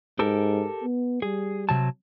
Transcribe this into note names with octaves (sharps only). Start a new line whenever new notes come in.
G#2 G4 A4 A#4
B3
G3 G#4
C3 F#3 A5